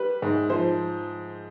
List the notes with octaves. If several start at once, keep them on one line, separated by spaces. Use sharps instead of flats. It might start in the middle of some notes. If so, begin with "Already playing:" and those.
Already playing: G3 B4
G#2
F3 C5